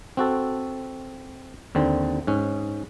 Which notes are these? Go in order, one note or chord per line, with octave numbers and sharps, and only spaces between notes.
C4 F#4 A4
D#2 D3 C4
G#2 C#4